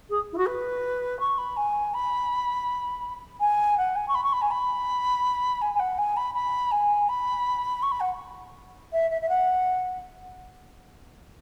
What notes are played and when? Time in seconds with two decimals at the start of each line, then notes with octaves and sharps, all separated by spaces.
0.09 G#4
0.32 E4
0.37 F#4
0.46 B4
1.20 C#6
1.38 B5
1.56 G#5
1.94 B5
3.40 G#5
3.78 F#5
3.96 G#5
4.08 C#6
4.15 B5
4.24 C#6
4.33 B5
4.41 G#5
4.51 B5
5.61 G#5
5.74 G#5
5.79 F#5
5.98 G#5
6.17 B5
6.34 B5
6.71 G#5
7.09 B5
7.82 C#6
7.91 B5
8.00 F#5
8.92 E5
9.10 E5
9.21 E5
9.29 F#5